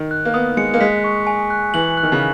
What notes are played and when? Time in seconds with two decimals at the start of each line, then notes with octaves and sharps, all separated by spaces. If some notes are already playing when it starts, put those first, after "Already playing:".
Already playing: D#3
0.11 F#6
0.25 A#3
0.34 B3 D#6
0.57 G#3 C#7
0.74 A#3
0.80 G#3 B6
1.04 C#6
1.27 G#5
1.50 F#6
1.74 E3 F#7
1.97 F#6
2.03 D#3
2.12 C#3